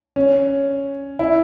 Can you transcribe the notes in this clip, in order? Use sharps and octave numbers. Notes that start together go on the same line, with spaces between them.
C#4
E4